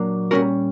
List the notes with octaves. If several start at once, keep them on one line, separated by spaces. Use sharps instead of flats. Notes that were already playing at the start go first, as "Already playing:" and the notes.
Already playing: A#2 F#3 A#3 D4
A#2 G3 C#4 F#4 A#4